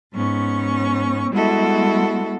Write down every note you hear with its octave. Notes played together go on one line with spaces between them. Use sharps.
G#2 B3 C#4 C#6
G3 G#3 B3 E4 F#4 A4